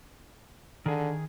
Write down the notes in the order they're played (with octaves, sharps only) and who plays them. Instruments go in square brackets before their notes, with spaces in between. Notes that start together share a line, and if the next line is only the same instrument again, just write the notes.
[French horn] D3 [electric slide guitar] D#3 G#4